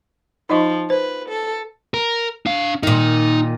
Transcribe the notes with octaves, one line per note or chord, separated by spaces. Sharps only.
F3 D#4 D#5 C#6
B4 C5
A4
A#4
D4 F5
A#2 D#3 D#4